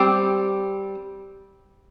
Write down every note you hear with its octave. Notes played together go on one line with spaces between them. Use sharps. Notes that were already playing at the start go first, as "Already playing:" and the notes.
Already playing: G3 C4 G4